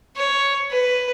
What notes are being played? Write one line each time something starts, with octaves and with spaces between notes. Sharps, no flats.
C#5
B4